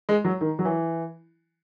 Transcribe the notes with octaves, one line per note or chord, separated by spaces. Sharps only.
G#3
F#3
D#3
F#3
E3